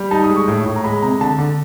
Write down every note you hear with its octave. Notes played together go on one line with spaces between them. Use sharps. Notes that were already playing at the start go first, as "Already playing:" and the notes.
Already playing: G3
D#4 A5
D#6
G#3
C#6
A2
A2
A#5
G#3 B5
C3 A#5
D3 A5
D3